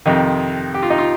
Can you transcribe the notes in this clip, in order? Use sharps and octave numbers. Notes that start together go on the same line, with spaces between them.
F2 C3 D#3 D#4
G4
F4
D#4
F4